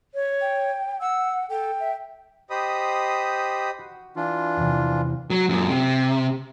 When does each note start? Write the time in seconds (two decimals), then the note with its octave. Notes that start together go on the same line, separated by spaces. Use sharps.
0.14 C#5
0.41 G5
1.01 F#5 E6
1.50 A4 G5
1.80 E5
2.50 G4 C5 D#5 B5 D#6
3.79 F#4
4.16 E3 D4 F4
4.57 E2 C3
5.30 F#3
5.49 F#2 A#2
5.70 C3